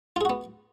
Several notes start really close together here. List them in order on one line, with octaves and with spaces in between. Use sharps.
F4 G#4 F#4 B3